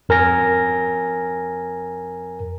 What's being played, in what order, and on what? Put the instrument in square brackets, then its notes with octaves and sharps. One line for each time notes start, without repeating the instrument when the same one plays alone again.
[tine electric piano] F2 A#4 G#5 A#6